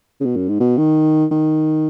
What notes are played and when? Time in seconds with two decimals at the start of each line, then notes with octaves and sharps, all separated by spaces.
0.20 C#3
0.25 B2
0.36 F#2
0.49 G#2
0.60 B2
0.78 D#3
1.31 D#3